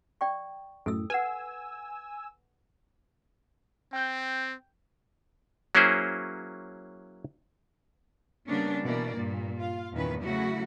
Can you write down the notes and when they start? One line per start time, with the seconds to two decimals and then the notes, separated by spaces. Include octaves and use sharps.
0.21 D5 G5 C#6
0.86 F#2 A2 A4 E6
1.10 B4 F#5 G#5 E6
3.93 C4 G5 G6
5.75 F#3 A#3 C#4 E4 G#4 C5
8.48 C#3 G3 A#3 B3 C#4 D4
8.84 B2 E3 A#3 D5
9.16 G2 A#2
9.58 F4 F5
9.92 E2 G2 A#2 D#3 C#4 B4
10.22 C#3 F#3 A3 E4 F#4